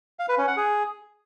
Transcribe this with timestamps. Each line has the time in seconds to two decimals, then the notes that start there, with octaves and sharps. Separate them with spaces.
0.19 F5
0.29 B4
0.38 C#4
0.47 F#5
0.57 G#4